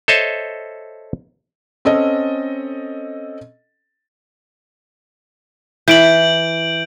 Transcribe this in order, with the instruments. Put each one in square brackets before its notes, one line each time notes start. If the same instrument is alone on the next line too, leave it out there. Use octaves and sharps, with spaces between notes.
[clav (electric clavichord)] A4 C5 C#5 D#5 E5 A5
[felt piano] C4 C#4 A4 D#5
[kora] E3 [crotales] G6 D7 F#7